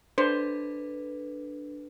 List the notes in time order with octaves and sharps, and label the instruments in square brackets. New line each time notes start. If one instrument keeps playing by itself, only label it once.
[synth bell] D4 A4 B4 [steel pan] C5